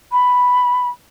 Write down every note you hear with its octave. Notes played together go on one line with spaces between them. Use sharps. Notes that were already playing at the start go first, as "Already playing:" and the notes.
B5